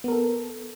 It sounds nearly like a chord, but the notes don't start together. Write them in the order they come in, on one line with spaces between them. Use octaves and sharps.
B3 A#4 A4